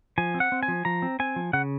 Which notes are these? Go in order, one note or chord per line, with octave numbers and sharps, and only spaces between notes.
F3 G#5
C4
F#5
C4
G#5
F3
F3 A#5
C4
C4 G#5
F3
C#3 F#5